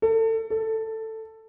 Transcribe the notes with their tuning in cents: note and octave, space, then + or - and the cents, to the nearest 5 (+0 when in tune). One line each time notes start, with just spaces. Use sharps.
A4 +30
A4 +10